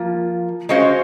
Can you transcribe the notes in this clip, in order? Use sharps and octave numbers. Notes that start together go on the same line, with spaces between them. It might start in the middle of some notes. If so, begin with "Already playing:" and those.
Already playing: F3 A#3 F4
G#3 C#4 F#4 C5 F5